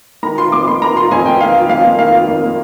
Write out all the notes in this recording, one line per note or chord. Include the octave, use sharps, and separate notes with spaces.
D#3 A#5
F4 C6
F2 D6
A#3 C6
D#3 A#5
F4 C6
F2 G#5
A#3 G5
D#3 F5
F4
F2 F5
A#3
D#3 F5
F4
F2
A#3